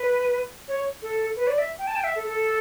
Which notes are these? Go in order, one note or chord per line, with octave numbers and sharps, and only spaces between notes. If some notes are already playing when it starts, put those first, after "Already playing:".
Already playing: B4
C#5
A4
B4
D5
E5
G5
A5
G5
E5
A4
A4